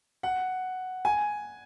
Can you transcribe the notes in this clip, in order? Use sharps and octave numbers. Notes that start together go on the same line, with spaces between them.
F#5
G#5